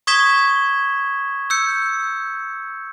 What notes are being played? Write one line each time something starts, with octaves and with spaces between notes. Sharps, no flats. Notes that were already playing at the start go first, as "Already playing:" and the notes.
C#6 D#6 G#6 B6 E7 G7
E6 G6 C#7